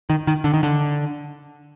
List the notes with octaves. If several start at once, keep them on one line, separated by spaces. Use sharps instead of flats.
D#3
D#3
D3
D#3
D3